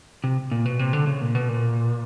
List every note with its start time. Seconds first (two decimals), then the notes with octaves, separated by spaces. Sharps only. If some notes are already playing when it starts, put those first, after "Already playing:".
0.24 C3
0.51 A#2
0.65 B2
0.79 C3
0.93 D3
1.07 C#3
1.21 A#2
1.35 B2
1.48 A#2